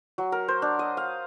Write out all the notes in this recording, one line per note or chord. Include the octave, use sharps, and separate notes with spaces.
F#3
A#4
C5
D4
D#5
F5